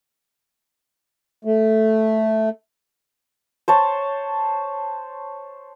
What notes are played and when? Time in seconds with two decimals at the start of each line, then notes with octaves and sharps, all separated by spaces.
1.45 A3
3.68 C5 C#5 A5